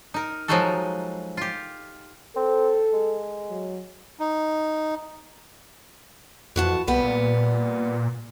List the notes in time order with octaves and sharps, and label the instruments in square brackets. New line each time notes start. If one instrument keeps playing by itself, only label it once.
[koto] D#4 A#4
F3 F#3 G#3 D#4 F#4 A4
F4 G4
[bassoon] C4 [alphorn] A4
[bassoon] G#3
[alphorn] F#3
[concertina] D#4
[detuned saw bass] F2 [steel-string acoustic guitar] E3 F#4 A5
[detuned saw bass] C2 [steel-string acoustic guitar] G3 B3
[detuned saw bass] A#2